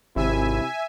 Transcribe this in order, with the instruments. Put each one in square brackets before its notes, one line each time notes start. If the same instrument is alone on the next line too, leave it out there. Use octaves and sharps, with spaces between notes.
[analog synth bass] G#1 [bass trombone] C3 [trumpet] E4 [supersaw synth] E5 G#5